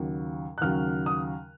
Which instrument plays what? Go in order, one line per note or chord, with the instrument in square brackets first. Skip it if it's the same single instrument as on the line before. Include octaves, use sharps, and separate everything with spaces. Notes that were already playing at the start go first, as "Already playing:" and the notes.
Already playing: [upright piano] D#2 C#3 F#3
F#6
D#2 C#3 F#3 F6
D#6